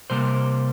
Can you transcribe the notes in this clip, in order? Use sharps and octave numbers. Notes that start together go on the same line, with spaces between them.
C3 G3 A#3 C5